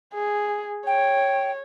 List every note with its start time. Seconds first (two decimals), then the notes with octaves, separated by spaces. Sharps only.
0.14 G#4
0.87 C#5 G5